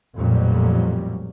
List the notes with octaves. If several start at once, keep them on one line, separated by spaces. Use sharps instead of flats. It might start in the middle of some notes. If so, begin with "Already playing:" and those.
A1 F2 A#2 F#3 G3